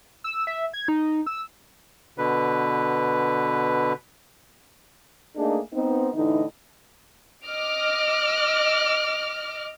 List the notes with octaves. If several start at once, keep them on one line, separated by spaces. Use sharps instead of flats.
E6
E5
G#6
D#4
E6
B2 D3 B4
A3 A#3 D4 D#4 G#4 A4
B3 C4 D#4
A2 D3 E3 D#4
D#5 D6 F6